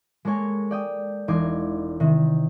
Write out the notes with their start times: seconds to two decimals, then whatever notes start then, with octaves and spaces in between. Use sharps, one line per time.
0.25 G#3 A#3 A4 C#5 G#5
0.71 D5 G5 D#6
1.28 E1 D#4 C6 D6 G#6
2.00 C3 D#3